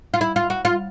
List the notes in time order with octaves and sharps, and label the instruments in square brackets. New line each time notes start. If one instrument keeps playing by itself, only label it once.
[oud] F4
E4
F4
F#4
F4